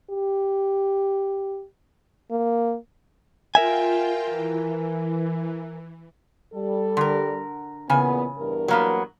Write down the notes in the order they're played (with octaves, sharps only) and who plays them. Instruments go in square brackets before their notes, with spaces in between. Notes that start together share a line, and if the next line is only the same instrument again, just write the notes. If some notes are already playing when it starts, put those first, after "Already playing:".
[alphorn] G4
A#3
[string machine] F4 G5 [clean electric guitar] A#4 E5 G#5
[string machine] E3
[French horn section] G3 A4
[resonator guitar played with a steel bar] D3 A#4
[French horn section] E2 A#2 B3 [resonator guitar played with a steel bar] C#3 G#5
[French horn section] E2 G2 A#4
[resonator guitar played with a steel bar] F#3 A#3 B3